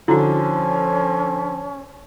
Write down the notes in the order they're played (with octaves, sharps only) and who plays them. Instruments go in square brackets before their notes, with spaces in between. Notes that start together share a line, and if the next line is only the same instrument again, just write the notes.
[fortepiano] D3 [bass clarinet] F3 [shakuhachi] C#4 [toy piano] E4 F#4